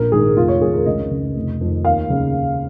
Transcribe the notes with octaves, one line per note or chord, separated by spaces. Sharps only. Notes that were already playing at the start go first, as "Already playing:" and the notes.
Already playing: A#1 A#4
G#2 D#3 G#4
F1 F4
C#5
F2 D#3 G#4
A#4
C#2 D#5
C#3
F1
F2 D#3
D#2 F5
C#3